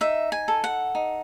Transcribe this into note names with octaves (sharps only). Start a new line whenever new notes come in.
D#4 E5
G#5
A4
F#5
D#4